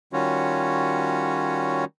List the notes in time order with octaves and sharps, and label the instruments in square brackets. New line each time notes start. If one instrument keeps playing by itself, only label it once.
[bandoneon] D#3 G3 C#4 F4 F#4 C#5